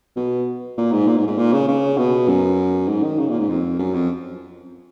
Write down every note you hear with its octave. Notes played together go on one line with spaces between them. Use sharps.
B2
A#2
G#2
A#2
G#2
G#2
A#2
C#3
C#3
B2
F#2
G#2
D#3
C#3
A#2
G#2
F2
F#2
F2